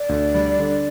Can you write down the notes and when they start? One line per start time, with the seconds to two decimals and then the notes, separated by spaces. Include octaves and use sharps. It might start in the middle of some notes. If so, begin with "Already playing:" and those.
Already playing: D5
0.09 D2
0.34 G3
0.59 D3